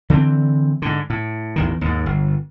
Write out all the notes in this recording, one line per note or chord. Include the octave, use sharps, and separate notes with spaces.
D3 E3 G#3 C4
G#2 D3
A2
A1 E2 D#3
D#2 G#2
G1